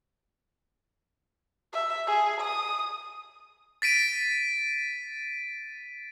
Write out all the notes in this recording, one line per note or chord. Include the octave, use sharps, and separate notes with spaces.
E5
G#4
D#6
A6 B6 D7 D#7